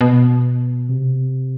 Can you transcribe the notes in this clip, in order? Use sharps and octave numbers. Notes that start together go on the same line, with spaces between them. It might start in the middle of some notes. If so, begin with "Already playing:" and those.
B2
C3